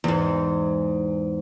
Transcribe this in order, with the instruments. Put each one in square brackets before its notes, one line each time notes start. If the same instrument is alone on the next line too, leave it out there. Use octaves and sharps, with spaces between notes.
[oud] E2 G#2